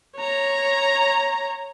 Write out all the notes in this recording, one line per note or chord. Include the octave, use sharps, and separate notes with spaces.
C#5 A#5